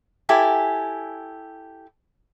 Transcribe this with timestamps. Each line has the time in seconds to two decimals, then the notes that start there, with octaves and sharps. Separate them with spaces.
0.29 E4 G4 A4 G#5